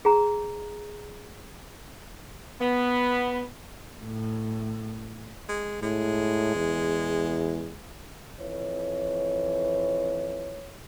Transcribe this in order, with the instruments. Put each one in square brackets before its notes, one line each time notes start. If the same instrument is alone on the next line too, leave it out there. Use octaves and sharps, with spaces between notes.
[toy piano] G#4 A#5
[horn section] B3
[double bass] A2
[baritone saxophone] G#3
[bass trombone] A2 [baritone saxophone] G#3
[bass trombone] E2
[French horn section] F2 E3 C#5